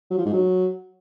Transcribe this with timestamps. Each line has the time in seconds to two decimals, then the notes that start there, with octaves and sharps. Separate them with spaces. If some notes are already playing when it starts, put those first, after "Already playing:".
0.11 F#3
0.18 F3
0.26 G#2
0.33 F#3